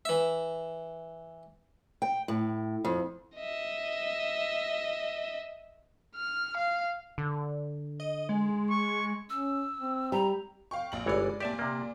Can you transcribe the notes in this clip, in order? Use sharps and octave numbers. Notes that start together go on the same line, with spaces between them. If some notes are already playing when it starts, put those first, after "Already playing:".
E3 E5
G5
A2
F2
D#5 E5
F6
F5
D3
D#5
G#3
C#6
C#4 E6
C4
G3 A#5
F5 G5 C#6
A#1 F#7
G1 E3 G#3 C#5 D5
A#2 G4 D5 E5 A5
C3 A#3